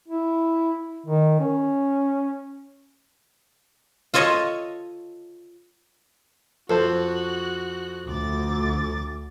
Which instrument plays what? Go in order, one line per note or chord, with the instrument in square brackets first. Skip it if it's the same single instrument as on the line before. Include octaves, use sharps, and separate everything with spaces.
[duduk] E4
D#3
C#4
[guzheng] F4 A4 C#5 D#5
[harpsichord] F2 [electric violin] F#4 F#6 [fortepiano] A4 C5
[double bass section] D2 [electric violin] D6 A6